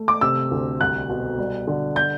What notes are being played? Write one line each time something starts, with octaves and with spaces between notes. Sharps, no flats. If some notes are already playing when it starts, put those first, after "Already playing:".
Already playing: A3
D6
C3 E6
D2
C2 F#6
B2
G3
D3
G6